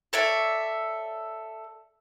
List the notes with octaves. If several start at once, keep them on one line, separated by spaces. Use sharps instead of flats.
A4 C#5 D5 E5